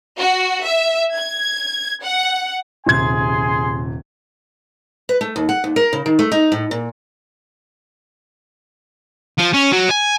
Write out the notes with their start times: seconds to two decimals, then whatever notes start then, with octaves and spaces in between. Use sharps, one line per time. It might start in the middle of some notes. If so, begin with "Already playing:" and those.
0.18 F#4
0.65 E5
1.14 G#6
2.04 F#5
2.87 D#1 C3 G#4 G#5 C6 G#6
5.09 B4
5.21 A3
5.36 D#2
5.49 F#5
5.64 D#2
5.76 A#4
5.93 C#3
6.06 D#3
6.19 A3
6.32 D#4
6.52 A2
6.71 A#2
9.38 F3
9.53 C#4
9.72 F#3
9.90 G#5